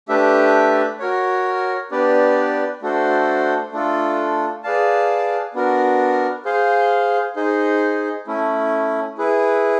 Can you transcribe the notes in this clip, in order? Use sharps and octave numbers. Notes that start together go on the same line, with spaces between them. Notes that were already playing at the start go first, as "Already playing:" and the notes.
A3 D4 G4 B4 E5
F#4 A#4 C#5
B3 D4 G4 B4 D5
A3 D4 F#4 A4 C5
A3 D4 F4 A4
G#4 B4 D5 F5 A5
B3 D4 F#4 A#4
G#4 C5 F5
D#4 G#4 C5
A3 C#4 E4
E4 G#4 B4